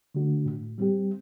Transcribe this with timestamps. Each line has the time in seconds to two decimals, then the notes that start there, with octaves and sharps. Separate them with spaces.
0.15 D3 A3 D4 F#4
0.46 A2
0.78 G3 C4 G4